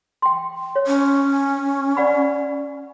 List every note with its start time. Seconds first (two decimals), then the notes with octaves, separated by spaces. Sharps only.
0.22 G5 C6
0.76 C#5
0.87 C#4
1.97 D5 F#5 B5